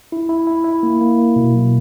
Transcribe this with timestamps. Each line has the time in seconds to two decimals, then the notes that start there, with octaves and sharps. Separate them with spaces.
0.12 E4
0.29 E4
0.47 E4
0.64 E4
0.83 A#3
1.01 A#3
1.19 A#3
1.36 B2
1.54 F#3